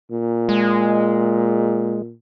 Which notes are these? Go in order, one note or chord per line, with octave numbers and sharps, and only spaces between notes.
A#2
G#3